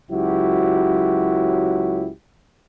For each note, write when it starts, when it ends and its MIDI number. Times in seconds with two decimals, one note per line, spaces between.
0.11 2.08 37
0.11 2.08 54
0.11 2.08 64
0.11 2.08 66
0.11 2.08 67